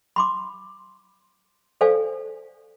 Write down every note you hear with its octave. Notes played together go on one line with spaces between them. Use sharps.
B5 C6 D6
A4 C5 D5 F5 G#5